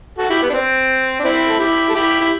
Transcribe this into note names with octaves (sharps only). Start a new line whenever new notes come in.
F#4 A4
E4 G4
B3
D4
C4
D4
C4 E4
A4
E4 G4
A4
E4 G4
E4